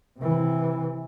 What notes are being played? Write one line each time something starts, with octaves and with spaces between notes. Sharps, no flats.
C3 E3